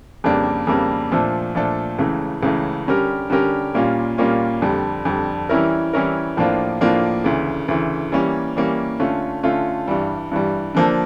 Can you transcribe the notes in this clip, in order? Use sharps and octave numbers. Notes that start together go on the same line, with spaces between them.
F2 C#3 G3 A#3 D4
F2 C#3 G3 A#3 D4
A#2 F3 A3 D4 A4
A#2 F3 A3 D4 A4
C#2 C#3 E3 A3
C#2 C#3 E3 A3
D3 G3 C#4 G4 A#4
D3 G3 C#4 G4 A#4
A#2 G3 A#3 C#4 F4
A#2 G3 A#3 C#4 F4
F2 D3 G3
F2 D3 G3
E3 G3 C#4 E4 A#4
E3 G3 C#4 E4 A#4
A2 F3 A#3 D4 F4
A2 F3 A#3 D4 F4
D2 C#3 E3
D2 C#3 E3
E3 G3 A#3 C#4
E3 G3 A#3 C#4
D3 A3 C#4 F4
D3 A3 C#4 F4
G2 E3 G3
G2 E3 G3
D3 F3 A#3 D4 A4